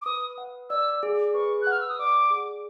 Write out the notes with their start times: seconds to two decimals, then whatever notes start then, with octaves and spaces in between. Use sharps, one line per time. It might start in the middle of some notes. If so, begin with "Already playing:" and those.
0.02 D6
0.05 B4 D#6
0.38 F#5
0.70 D5 E6
1.03 G#4
1.34 B4 C#6
1.62 F#6
1.67 F#5 F6
1.81 E6
1.89 D#6
1.99 D5 D6
2.31 G#4